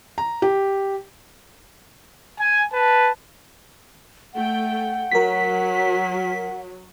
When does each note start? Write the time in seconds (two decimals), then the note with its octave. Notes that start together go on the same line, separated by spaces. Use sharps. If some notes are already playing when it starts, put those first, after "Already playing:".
0.18 A#5
0.42 G4
2.39 G#5
2.72 B4 A5
4.34 A3 F#5 G5
5.11 F#3 A#4 B6